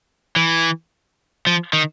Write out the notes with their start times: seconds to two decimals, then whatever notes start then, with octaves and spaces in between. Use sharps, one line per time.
0.36 E3
1.47 F3
1.73 D#3